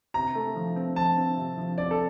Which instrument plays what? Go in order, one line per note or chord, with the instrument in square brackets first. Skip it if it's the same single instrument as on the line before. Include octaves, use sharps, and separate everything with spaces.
[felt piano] C3 [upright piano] A#5
[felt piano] A3
F3
C4
[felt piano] F3 [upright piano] A5
[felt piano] C4
C3
F3
[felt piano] C4 [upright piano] D5
[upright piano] A4